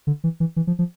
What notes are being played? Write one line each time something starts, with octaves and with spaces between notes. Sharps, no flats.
D3
E3
E3
E3
F3
F3